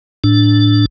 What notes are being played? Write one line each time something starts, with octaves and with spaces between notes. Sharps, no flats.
A2 D4